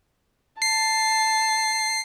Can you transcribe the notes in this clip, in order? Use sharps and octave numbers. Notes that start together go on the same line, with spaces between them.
A5 C7